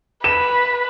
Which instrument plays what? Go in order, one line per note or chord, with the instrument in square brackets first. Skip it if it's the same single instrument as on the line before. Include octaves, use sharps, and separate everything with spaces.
[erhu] B4 [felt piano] E7